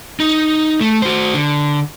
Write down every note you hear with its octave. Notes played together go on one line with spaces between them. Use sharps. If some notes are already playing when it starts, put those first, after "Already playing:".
D#4
A3
F#4 C5
D3